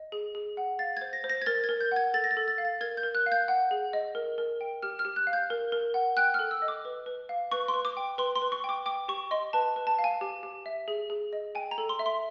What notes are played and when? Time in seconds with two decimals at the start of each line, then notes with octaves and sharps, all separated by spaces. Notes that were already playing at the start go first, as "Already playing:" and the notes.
Already playing: D#5
0.12 G#4
0.35 G#4
0.57 F#5
0.79 F5 A6
0.97 C5 G#6
1.13 A#6
1.24 C5
1.30 A#6
1.42 G#6
1.46 A#4 A6
1.64 G#6
1.69 A#4
1.81 G6
1.92 F#5 G#6
2.14 A4 A6
2.24 A#6
2.31 A6
2.37 A4
2.48 A6
2.58 F5
2.65 A6
2.81 A#4 G#6
2.97 G6
3.03 A#4
3.15 F#6
3.26 F5
3.32 G6
3.48 F#5
3.71 G#4
3.93 D#5
4.15 A#4
4.38 A#4
4.61 G5
4.82 G4 F6
4.99 F6
5.05 G4
5.16 F#6
5.27 F5
5.33 G6
5.50 A#4
5.72 A#4
5.94 F#5
6.17 G5 F#6
6.34 A4 F6
6.51 E6
6.62 D#5
6.68 D6
6.85 B4
7.06 B4
7.29 F5
7.51 B4 C#6
7.68 C6
7.74 B4
7.85 D6
7.97 G5
8.18 B4 C6
8.36 C6
8.42 B4
8.52 C#6
8.64 G5 D6
8.86 G5 D6
9.08 G4 C#6
9.31 D#5 C6
9.53 B4 A5
9.76 B4
9.87 A5
9.99 F5
10.04 G#5
10.21 G4
10.43 G4
10.66 E5
10.88 G#4
11.10 G#4
11.33 D#5
11.55 G5 G#5
11.71 A#5
11.78 A4
11.89 C6
11.99 E5
12.06 C6